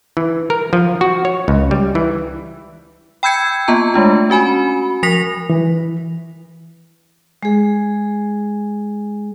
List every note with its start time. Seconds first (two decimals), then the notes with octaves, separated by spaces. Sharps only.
0.17 E3
0.50 A#4
0.73 F3
1.01 F#4
1.25 C#5
1.48 C#2
1.71 G3
1.95 E3
3.23 G5 B5 E6 G6 G#6 C#7
3.68 A#3 B3 F4 A5 A#5
3.94 G#3 A3 D4 F4
4.30 C#4 F#4 G#5 B5
5.03 F3 A#4 A#6 B6 F7
5.50 E3
7.43 G#3 G#4